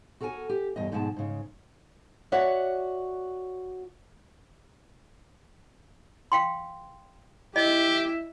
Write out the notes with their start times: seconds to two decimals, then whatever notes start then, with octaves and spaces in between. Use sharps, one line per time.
0.21 F#4 A4 A#4 G5 G#5
0.49 G4
0.76 E2 G2 B2 G4 D#5
0.92 F2 G#2 B2 G#3 G#5 A5
1.16 G#2 C#3
2.32 F#4 C#5 D5 E5 F#5
6.32 F5 G5 C6
7.56 E4 G4 D#5 E5